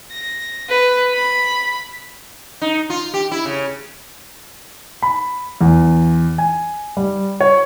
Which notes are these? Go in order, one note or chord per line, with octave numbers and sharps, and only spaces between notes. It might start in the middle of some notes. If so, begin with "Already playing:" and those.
A#6
B4
B5
D#4
F4
G4
E4
C#3
B5
E2
G#5
G3
C#5